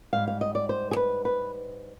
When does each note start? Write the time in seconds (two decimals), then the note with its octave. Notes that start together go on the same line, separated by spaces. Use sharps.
0.13 G#2 G3 F5
0.27 F5
0.41 D#5
0.55 D5
0.69 C5
0.91 G#4
0.96 B4
1.25 B4